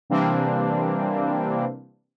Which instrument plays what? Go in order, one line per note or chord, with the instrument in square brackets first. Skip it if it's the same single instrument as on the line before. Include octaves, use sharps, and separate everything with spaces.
[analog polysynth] C3 E3 G3 A#3 C4 D4